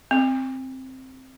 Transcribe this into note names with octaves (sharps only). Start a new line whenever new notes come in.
C4